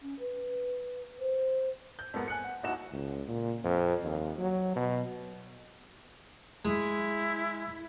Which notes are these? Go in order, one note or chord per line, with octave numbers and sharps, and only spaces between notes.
C#4
B4
C5
G6
F2 G#2 A#3 B3
G#5 F#6 C#7
F#5
D#1 D#2 D#4 E4 F#4 E7
C#2
A#2
F2
D#2
F#3
B2
G#3 E4